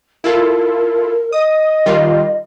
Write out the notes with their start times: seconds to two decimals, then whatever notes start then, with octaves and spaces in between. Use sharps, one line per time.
0.24 E4 F4 A4 A#4
1.33 D#5 D#6
1.86 D#3 G3 F4